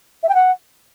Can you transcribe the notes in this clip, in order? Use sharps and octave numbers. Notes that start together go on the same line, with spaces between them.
E5
G5
F#5